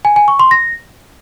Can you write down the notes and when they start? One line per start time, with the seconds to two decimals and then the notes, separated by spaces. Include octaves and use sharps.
0.05 G#5
0.16 G#5
0.28 C#6
0.39 C6
0.51 A#6